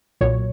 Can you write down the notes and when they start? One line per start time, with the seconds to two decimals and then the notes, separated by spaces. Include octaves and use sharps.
0.21 B1 A#2 F#3 C#5